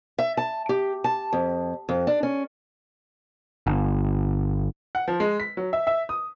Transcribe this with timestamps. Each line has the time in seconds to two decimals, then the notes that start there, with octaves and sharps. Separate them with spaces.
0.18 E5
0.37 A5
0.69 G4
1.04 A5
1.33 F2
1.89 F2
2.07 D4
2.23 C#4
3.67 G1
4.95 F#5
5.08 F3
5.20 G#3
5.40 B6
5.57 F#3
5.73 E5
5.87 E5
6.09 D#6